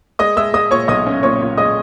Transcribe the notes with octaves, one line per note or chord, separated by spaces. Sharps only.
G#3 D#5 D#6
G#3 E5 E6
G#3 D#5 D#6
A#2 C#5 C#6
B1 D#5 D#6
C#4
A#2 C#5 C#6
A#2
G#3 D#5 D#6